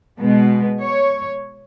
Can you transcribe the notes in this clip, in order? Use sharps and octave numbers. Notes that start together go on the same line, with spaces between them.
B2 G#3 B3
C#5